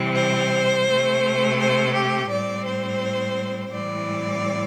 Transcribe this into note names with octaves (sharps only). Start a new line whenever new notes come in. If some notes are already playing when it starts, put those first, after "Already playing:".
Already playing: C3 E3 G3 C4
C5
C3 A3 C4
C5
G4
A2 G3 C4 D5
C5
A2 E3 G3 C4 D5